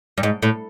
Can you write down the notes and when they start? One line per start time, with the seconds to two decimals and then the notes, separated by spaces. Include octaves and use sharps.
0.18 G2
0.23 G#2
0.42 A2